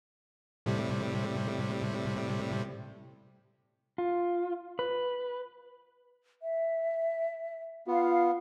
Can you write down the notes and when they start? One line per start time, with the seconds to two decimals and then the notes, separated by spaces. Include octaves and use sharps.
0.66 A2 C3 G3
3.98 F4
4.79 B4
6.42 E5
7.87 B3 F4 F5